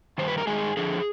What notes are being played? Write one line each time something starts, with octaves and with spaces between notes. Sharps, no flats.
G2 D#3 C5
B4
A#4
G2 D#3 G#3 G#4
F2 D3 F3 G#4